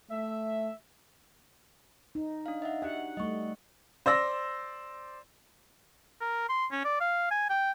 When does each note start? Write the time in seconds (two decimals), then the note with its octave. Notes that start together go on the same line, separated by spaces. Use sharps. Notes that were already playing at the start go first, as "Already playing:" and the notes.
0.11 A3 E5
2.15 D#4
2.46 D4 F5
2.62 D#5 E5 F#5
2.82 D4 G4 F#5
3.17 G3 A3 D#5 C#6
4.06 C5 D5 E6 A#6
6.21 A#4
6.49 C6
6.72 C#4
6.84 D5
7.01 F5
7.31 G#5
7.50 G5